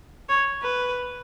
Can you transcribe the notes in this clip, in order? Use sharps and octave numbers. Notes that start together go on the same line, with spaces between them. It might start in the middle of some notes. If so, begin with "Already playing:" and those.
C#5
B4